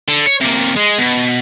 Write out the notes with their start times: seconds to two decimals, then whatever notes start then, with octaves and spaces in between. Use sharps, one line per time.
0.08 D3
0.26 C#5
0.41 C3 A#3
0.76 G#3
0.99 B2